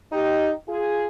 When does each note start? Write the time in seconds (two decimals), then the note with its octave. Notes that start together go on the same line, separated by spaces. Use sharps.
0.12 D#4 G4
0.68 F4 G#4